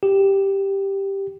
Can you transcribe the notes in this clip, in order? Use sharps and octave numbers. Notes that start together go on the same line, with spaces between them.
G4